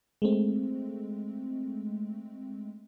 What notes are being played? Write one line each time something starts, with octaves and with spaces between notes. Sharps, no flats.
G#3 A3 C4